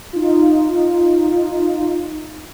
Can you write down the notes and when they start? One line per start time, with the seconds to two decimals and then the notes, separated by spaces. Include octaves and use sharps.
0.13 D#4 F4